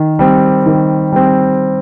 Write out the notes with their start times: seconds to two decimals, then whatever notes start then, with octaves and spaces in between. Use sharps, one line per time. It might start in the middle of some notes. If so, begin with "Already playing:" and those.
Already playing: D#3
0.19 G3 C4
0.66 D#3
1.12 G3 C4